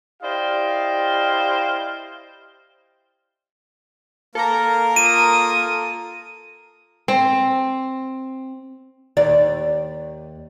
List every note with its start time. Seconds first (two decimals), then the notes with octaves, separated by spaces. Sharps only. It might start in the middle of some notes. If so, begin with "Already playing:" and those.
0.22 E4 G4 C5 D5 D#5 F5
4.35 A#3 A4 A#4 A#5
4.96 F4 D#6 D#7
7.08 C4
9.17 D#2 D5